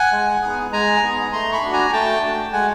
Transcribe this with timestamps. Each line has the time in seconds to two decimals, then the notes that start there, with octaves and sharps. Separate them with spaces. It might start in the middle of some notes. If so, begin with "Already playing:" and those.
Already playing: F#5 G#5
0.12 G#3
0.42 B3 D#4 G#4
0.72 G#3 G#5 A#5
1.03 B3 D#4 G#4
1.33 A3 A#5 C6
1.52 B5 C#6
1.62 D4 F#4
1.73 G#5 A#5
1.93 A3 G5 A5
2.23 D4 F#4
2.53 G#3 F#5 G#5